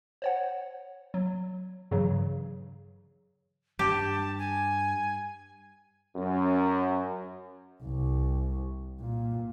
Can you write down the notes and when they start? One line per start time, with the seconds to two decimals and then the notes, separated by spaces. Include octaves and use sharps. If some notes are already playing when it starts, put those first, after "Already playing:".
0.22 C5 C#5 F#5
1.14 F#3
1.91 G2 C#3 E3 F#3
3.79 G2 G4 A5
4.39 G#5
6.16 F#2
7.83 C2
8.99 A#2